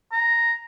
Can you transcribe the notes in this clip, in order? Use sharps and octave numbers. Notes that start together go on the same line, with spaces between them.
A#5